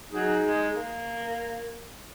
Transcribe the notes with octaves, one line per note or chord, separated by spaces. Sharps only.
F#3 D#4 G#4
G#3
A#3